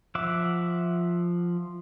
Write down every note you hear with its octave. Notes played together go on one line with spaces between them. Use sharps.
F3 E5 F#5 D6